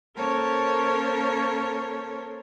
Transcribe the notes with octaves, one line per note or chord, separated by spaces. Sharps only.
A#3 C#4 A4 A#4 C5 C#5